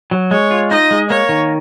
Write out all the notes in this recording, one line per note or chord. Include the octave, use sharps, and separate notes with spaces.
F#3
G#3 C#5
F4
D#4 D#5
G#3
A#3 C#5
D#3